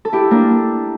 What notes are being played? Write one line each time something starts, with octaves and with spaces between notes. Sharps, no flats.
A4
E4 G4
A#3 D4